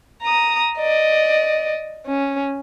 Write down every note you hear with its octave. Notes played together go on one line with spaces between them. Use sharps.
A#5 D#6
D5 D#5
C#4